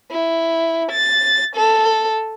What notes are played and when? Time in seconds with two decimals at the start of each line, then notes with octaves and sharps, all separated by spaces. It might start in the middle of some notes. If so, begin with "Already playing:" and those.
0.11 E4
0.91 A6
1.56 A4